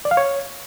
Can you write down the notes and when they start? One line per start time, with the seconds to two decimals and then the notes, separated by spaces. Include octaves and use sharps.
0.05 D5
0.11 F5
0.17 C#5